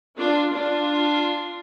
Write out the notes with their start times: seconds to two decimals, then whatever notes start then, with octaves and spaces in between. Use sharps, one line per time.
0.18 D4 F4
0.53 D4 F4